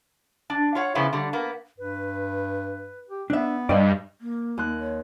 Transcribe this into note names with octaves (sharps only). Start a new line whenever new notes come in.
D4
F4 C#5 F#5
C#3 F3 B3 E4 F4
D3 G3
A#3 B3
G2 B4
G4
B3 D4 E5
G2 D5 D#5 F5
A#3
D#2 C6 F#6
C#5